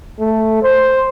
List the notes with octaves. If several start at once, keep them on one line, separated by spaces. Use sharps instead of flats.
A3
C5